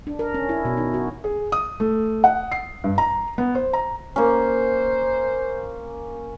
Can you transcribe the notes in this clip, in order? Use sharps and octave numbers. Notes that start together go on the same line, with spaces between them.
D4
A#4
C#4
E4
B2
D#4
F#4
G#4
D#6
A3
F#5
C7
G2
A#5
B3
C5
A#5
A#3 C#4 C5